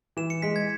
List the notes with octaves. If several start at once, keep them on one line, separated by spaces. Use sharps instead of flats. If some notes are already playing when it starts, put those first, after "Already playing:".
E3 E7
C#7
G#3 B6
G#6